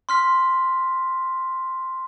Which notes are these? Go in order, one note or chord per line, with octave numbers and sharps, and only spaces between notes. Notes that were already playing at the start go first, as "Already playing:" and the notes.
C6 F6 B6